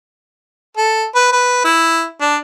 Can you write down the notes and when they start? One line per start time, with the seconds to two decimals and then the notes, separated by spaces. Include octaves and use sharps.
0.77 A4
1.15 B4
1.33 B4
1.64 E4
2.21 D4